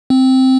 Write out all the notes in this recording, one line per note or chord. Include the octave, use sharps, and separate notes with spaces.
C4